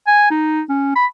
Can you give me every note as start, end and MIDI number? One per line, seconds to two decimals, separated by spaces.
0.07 0.28 80
0.31 0.62 63
0.69 0.91 61
0.96 1.05 83